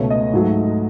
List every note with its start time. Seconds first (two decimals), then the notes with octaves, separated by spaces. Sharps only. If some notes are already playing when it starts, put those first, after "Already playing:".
Already playing: C#2 B2 A3 C#5
0.10 D#5
0.33 G#2 F#3 A3